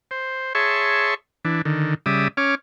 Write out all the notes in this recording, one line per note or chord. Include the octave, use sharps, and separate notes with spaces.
C5
G#4 C#5 E5 A5 C6 C#6
E3 D4
D3 D#3
C#3 G3 D5 E5 D#6
C#4 C#5 D6 F6